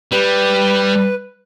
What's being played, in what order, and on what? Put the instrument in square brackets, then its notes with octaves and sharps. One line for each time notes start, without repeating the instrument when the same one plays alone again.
[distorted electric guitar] G3 [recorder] B4